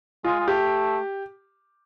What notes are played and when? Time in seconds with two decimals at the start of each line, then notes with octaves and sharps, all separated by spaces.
0.25 G#3 F4
0.40 G#3
0.48 A3 G4